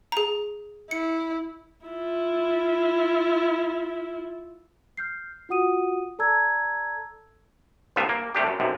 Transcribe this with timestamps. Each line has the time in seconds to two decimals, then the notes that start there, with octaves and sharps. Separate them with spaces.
0.12 G#4 A#5
0.91 E4 C#7
1.86 E4 F4
4.97 F6 G6 C7
5.49 F4 F#4 F#5 D#6 D#7
6.19 A4 D5 A5 A#5 E6 G#6
7.96 C2 G2 A#2 B3 F4 E5
8.09 A#3
8.35 C3 G3 A3 D4 G4
8.47 F#2
8.60 B1 F#2 C3